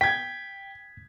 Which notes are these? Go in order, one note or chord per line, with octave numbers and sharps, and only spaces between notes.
G5 G#6 B6